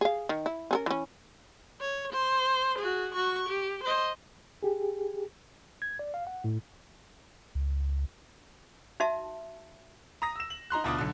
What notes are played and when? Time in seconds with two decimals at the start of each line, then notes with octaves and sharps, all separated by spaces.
0.01 G#4 F5
0.29 D#3
0.46 E4
0.71 C#4 G#4 A#4
0.86 E3 C#4
1.81 C#5
2.12 C5
2.78 F#4 G#4
3.14 F#4 C#6
3.48 G4
3.83 C5 D#5
4.63 G4 G#4
5.82 G#6
5.99 D5
6.14 F5
6.27 F#5
6.44 A2
7.55 C#2
9.00 D#4 F#4 E5 A5
10.22 A#5 D#6 A#6
10.36 E6 E7
10.50 F#7
10.70 D#4 A#5 C6 F#6
10.84 D2 B2 D4 F4 D6 D#6
10.98 B1 D3